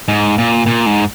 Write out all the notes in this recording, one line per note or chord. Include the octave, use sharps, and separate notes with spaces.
G#2
A#2
A#2
G#2